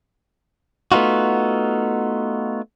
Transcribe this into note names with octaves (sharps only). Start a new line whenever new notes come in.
A3 B3 D#4 F4 F#4